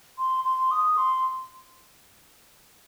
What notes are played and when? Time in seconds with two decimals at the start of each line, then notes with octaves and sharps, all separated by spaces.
0.18 C6
0.45 C6
0.71 D#6
0.97 C6